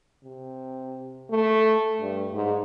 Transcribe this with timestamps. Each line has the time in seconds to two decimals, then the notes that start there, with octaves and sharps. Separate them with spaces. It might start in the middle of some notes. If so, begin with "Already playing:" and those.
0.24 C3
1.31 A3
2.01 G2
2.33 G#2